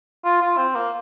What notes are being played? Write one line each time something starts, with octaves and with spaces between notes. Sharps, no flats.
F4
F4
C4
A#3